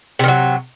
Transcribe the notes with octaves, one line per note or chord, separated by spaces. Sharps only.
C3 D#3 F#3